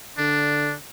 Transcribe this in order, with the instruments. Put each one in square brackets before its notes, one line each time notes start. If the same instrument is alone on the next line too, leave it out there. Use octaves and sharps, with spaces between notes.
[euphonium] D3 [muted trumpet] D4